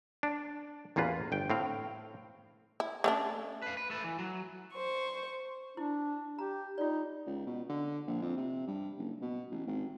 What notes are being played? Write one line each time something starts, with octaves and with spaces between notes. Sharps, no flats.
D4
A1 E2 A#3 F4 B4
G1 G5
A2 C4 F5
E4
A3 C#4 D4
B4 F5
B4
A3 A4 B4
E3
F#3
C5 C#6
D4 E4
G4 A#5
D#4 F4 D5
C#2
B2
D3
A#1
F2
C3
G2
F#1
B2
A1
G#1